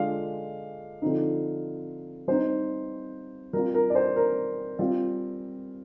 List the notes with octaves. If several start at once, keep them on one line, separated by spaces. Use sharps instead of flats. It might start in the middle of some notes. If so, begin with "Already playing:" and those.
Already playing: D3 G#3 D4 F4 F5
D3 F3 C4 D#4
G3 C4 D#4 C5
G3 C4 F4 A#4
A#4
D5
C5
A#4
G3 C4 F4